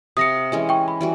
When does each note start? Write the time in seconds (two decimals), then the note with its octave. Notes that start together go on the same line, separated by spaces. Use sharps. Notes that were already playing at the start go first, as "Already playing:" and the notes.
0.17 C3 F5 D#6 A#6 C#7
0.52 E3 G#3 C#4
0.69 G5 C#6
0.88 B5
1.01 E3 G3 F#4